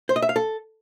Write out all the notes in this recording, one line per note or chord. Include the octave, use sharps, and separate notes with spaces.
C5
D#5
E5
F5
A4